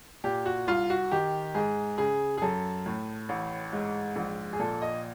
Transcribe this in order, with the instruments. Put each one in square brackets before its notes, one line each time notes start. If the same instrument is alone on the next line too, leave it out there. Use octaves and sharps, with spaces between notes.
[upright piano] A#2 G4
F#4
C2 F4
F#4
D#3 G4
G#2 G#4
C#3 G#4
G#4
F#2 A4
A2
A1
G#2
A#1
G#4
A#2 A4
D#5